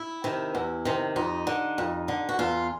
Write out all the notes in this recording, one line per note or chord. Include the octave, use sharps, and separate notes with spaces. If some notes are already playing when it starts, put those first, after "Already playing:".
Already playing: E4
C3 D#3
E2
C3 D#3
F2 D#4
D3
F2
D3
F#4
E2 F4